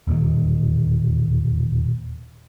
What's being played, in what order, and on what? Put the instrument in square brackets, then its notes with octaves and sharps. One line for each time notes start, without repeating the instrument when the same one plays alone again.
[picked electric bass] E1 D#2 A#2 D#3